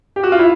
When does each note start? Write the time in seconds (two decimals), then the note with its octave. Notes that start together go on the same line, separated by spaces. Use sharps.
0.16 G4
0.23 F#4
0.32 F4
0.39 E4